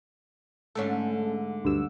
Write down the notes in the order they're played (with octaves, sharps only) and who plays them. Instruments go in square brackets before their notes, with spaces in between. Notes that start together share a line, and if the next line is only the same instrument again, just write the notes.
[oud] G#2 D3 A3 [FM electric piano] C#4 A4
[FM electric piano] D2 G2 E6